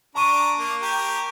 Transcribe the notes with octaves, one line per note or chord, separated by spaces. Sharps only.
D4 A5 A#5 C#6 D#7
A#3
G4 A#4